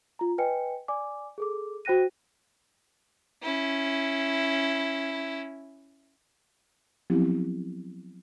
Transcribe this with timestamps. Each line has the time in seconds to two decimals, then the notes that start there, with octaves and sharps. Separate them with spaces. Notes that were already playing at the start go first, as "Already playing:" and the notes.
0.19 F4 A#5
0.38 B4 D#5 G5 G#5 C#7
0.88 D5 G#5 D6
1.38 G#4 A4 D6
1.85 F#4 C5 G5 F#6 A#6 D#7
3.42 C#4 E4
7.10 F3 F#3 B3 C4 E4 G4